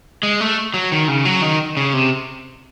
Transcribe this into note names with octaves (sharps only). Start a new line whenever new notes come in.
G#3
A3
F#3
D#3
C#3
F#3
D#3
C#3
C3